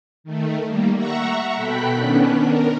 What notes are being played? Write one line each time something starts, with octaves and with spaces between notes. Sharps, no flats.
D#3 A3
G3 A#3
E5 F#5 A#5 C#6
B2 A4 G5 B5 F#6 B6
D#3 B3 C#4 D4
A#4